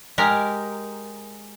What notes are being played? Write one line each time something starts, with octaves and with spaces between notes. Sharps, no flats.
G#3 G4 A#4